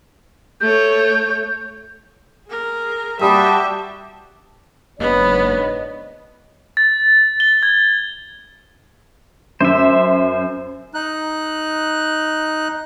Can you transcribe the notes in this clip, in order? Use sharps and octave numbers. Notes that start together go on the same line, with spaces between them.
A3 C#5 G6
G#4 A#4
G3 F#4 E5 G5 A5 B5 D6 D#6
F#1 G#2 B3 D4 C#5 D#5
A6
G7
G#6
F#2 C5 E5
D#4 F#6